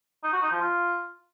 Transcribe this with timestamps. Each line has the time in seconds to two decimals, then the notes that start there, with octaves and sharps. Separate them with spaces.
0.24 D#4
0.33 F#4
0.42 D#4
0.51 F3
0.61 F4